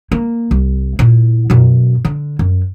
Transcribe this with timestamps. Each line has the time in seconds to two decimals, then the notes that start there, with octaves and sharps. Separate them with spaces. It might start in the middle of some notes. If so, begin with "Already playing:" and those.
0.12 A#3
0.51 C2
0.99 A#2 E4
1.50 F#2 B2
2.05 D3
2.39 F#2